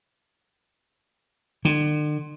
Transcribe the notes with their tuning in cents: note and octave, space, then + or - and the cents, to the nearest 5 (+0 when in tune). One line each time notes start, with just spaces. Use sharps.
D3 +40